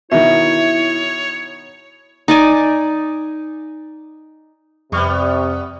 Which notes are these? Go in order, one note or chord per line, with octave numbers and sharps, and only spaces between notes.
B2 D#3 E4 C#5 E5
D#4 D5 G#5
F2 C3 G3 B3 C#6 F6